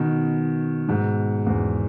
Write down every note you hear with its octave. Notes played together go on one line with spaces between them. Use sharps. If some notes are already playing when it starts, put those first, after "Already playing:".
Already playing: B2 D#3
G#2 B2
E2 G#2